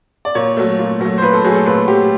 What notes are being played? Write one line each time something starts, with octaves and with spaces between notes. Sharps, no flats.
D5
A#2 C#5
F#3 A3
A#2
F#3 A3
C5
A#2 B4
A4
F#3 A3 G#4
A4
A#2 B4
F#3 A3 G4